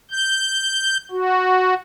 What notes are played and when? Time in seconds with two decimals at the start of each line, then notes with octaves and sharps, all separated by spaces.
0.11 G6
1.11 F#4